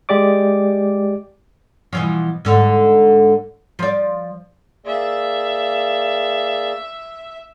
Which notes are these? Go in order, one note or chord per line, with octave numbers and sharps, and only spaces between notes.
G#3 G4 D5 D6
B2 E3 F3
G#2 D3
F3 D5
A#3 G#4 D5 E5